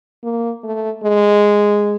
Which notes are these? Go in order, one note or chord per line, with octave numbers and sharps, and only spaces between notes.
A#3
A3
G#3